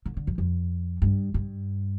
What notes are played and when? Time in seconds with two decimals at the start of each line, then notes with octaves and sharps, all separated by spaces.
0.06 D3
0.17 D3
0.27 F2
0.38 F2
1.02 G2
1.34 G2